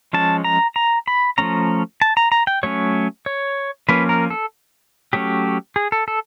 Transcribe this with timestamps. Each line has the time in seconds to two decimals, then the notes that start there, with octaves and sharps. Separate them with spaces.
0.13 F3 G#3 C#4 A5
0.44 A#5
0.76 A#5
1.07 B5
1.38 F3 A3 C#4 A#5
2.02 A5
2.17 A#5
2.32 A#5
2.47 G5
2.63 F#3 A3 C#4 C#5
3.26 C#5
3.89 F3 A#3 C#4 B4
4.09 A#4
4.30 A4
5.13 F#3 A3 C#4 G4
5.76 G#4
5.92 A4
6.08 A4